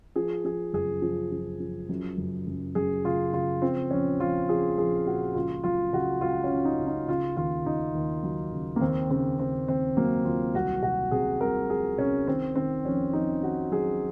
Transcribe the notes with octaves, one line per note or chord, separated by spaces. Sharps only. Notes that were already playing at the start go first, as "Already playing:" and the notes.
F3 G#4
F3 G#4
F#1 G#4
F3
F3
F3
F#2
F#1
F#1
F#2 G#4
C#3 F4
C#3 F4
F3 C4
A#1 C#4
A#1 F4
F3 G#4
A#1 G#4
A#2 F#4
C#2 F4
F#3 F4
C#3 F#4
C#2 F4
C#4
C#3
D#4
C#2
D#4
C#3 F4
D#2 F4
C#3 D#4
D#2
F#3
C#3
A#3
D#2 C4
C#3 C4
C#3 C4
D#2 C4
F#3 A#3
D#2 F4
C2 F#4
C3 F#4
C3 G#4
C2 A#4
F3 G#4
C2 C#4
D#3 C4
D#3 C4
F2 C#4
F2 D#4
D#3 F#4
F#3 G#4